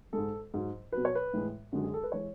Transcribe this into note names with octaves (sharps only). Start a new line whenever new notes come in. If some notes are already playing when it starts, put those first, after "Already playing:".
G#2 G#3 A4
G#2 F#3
F#3 B4
B2
C#5
B4
A2 E3 G#3
F#2 D3 G#3 F#4
G#4
A4
B4
E3 G#3 C#5